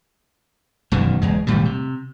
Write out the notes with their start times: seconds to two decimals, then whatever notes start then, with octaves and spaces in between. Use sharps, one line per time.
0.92 E1 F#2 B2 D#3
1.22 F#1 E2 G#3
1.47 E1 A2 D#3 G3
1.65 C3